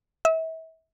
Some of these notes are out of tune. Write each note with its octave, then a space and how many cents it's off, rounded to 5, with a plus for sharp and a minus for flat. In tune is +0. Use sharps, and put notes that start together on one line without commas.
E5 -35